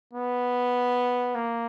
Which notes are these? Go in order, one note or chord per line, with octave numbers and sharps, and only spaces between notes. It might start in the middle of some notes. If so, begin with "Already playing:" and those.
B3
A#3